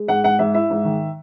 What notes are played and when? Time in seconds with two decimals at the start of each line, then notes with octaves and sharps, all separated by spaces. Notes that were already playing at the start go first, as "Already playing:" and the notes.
Already playing: G#3
0.08 G#2 F#5
0.24 G#2 F#5
0.39 G#2 E5
0.54 E4 E5
0.70 G#2
0.85 D#3